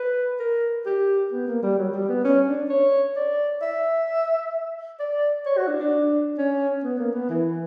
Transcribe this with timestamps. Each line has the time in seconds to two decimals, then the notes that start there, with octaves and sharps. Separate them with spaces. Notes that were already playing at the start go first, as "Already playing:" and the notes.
Already playing: B4
0.40 A#4
0.86 G4
1.32 B3
1.48 A#3
1.63 G3
1.78 F#3
1.93 G3
2.09 B3
2.24 C#4
2.46 D4
2.69 C#5
3.16 D5
3.62 E5
5.00 D5
5.46 C#5
5.57 F#4
5.68 D4
5.80 D4
6.38 C#4
6.84 B3
6.99 A#3
7.14 B3
7.29 E3